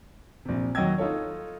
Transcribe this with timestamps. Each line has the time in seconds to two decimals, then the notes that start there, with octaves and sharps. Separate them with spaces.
0.45 A#1 C3
0.75 D#2 F#3 D#5 G5 E6 G#6
0.98 D#4 F4 A4 C#5